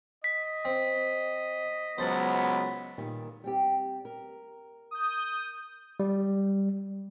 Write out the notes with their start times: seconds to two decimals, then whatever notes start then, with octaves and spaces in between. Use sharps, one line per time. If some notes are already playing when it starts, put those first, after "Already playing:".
0.24 D#5 B6
0.65 C4
1.98 C#2 F#3 B3 C5 A5 B5
2.98 A#2 D#3 G3
3.44 G3 C4 G4
4.05 A#4
4.91 D#6 G6
6.00 G3